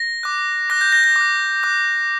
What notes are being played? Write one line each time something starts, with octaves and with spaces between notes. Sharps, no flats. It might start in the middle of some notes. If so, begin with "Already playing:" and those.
Already playing: A#6
D6 F#6
D6 F#6 A#6
G6
A#6
A#6
D6 F#6
D6 F#6